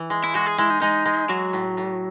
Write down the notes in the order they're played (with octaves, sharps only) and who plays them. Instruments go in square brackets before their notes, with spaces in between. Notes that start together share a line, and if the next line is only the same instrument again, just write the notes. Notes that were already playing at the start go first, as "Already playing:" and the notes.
Already playing: [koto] E3
G#3
[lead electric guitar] E4
[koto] G#3 [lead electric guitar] F#4
[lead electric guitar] G#4
[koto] G#3 [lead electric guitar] E4
[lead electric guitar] D#4
[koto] G#3 [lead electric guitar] D#4
[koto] G#3
[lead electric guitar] F#3 [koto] F#4
[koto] A2
A2